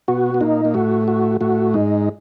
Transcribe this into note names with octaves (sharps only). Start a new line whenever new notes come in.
B2 B3 F#4
B3
A#2 A#3 D#4
A#3
A2 A3 F#4
F#4
A2 A3 F#4
G#2 G#3 D#4